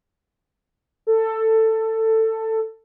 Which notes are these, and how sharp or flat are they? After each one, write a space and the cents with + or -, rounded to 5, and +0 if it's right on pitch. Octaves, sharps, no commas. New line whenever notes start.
A4 +15